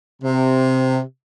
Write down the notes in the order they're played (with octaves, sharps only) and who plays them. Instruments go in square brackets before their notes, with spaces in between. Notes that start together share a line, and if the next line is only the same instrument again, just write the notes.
[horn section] C3